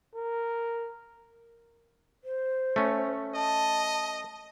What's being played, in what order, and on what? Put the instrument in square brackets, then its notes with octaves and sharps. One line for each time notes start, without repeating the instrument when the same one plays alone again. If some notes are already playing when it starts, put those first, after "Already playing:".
[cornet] A#4
[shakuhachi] C5
[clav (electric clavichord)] A3 C#4
[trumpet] D#5 [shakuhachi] A5